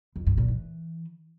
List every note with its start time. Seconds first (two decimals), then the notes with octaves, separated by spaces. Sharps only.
0.16 F2
0.27 G2
0.37 A#2
0.48 E3